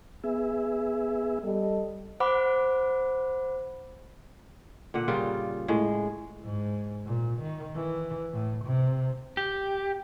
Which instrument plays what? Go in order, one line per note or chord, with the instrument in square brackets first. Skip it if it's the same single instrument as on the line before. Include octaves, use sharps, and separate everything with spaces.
[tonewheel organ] B3 G#4 E5
[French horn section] G3 A4 D#5
[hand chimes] C5 F#5 B5 D6
[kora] A#2 D3 F#5
C#3 G3 F4 A#4
A2 G#3
[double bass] G#2
A#2
D#3
E3
A2
C3
[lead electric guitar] G4